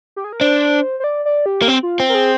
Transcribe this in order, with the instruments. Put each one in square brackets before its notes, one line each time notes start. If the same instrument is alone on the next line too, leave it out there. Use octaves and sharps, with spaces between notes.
[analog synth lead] G4
G#4
A#4
[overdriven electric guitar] D4 [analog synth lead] C5
[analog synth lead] C5
D5
D5
G4
[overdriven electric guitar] A#3
C4
[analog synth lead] F4
[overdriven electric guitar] C4
[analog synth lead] A#4
G#4